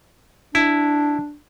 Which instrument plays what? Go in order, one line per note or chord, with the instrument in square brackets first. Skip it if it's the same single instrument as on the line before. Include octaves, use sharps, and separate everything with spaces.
[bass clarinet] D4 [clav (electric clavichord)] E4